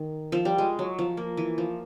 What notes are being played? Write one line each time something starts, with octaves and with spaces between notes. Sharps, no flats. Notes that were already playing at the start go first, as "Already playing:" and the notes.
Already playing: D#3
F3
G3
G#3
F#3
F3
A#3
E3
F3